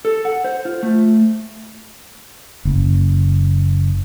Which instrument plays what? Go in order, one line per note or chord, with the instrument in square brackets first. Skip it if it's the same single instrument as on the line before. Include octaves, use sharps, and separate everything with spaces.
[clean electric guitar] A4
F#5
C5
F4
A3
[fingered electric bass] F#1